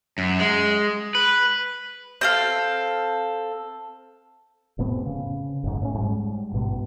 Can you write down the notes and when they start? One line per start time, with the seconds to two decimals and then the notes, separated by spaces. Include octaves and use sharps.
0.18 F#2
0.40 G#3
1.15 B4
2.21 C4 A4 F5
4.78 F1 A2 B3 C4
5.05 C#3
5.64 F#1 G#2
5.81 A2 C4 C#4
5.94 G#2 G3
6.53 A1 G2 B2